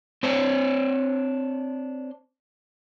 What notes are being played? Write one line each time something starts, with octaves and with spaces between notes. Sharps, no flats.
C4 D4 C5 C#5